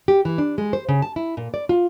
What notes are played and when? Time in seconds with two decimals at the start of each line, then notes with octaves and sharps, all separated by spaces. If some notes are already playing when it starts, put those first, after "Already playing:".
0.08 G4
0.25 E3
0.38 D4
0.58 G#3
0.73 C5
0.89 C#3
1.02 A5
1.16 E4
1.37 A#2
1.54 D5
1.69 F4